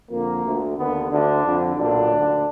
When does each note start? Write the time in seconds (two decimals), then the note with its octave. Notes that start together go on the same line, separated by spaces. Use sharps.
0.10 F2 D3 A#3
0.43 D2 D3
0.77 D#2 D3 B3
1.10 D2 D3 D4
1.44 F2 D3
1.76 B1 A#2 D4
2.10 D2 D3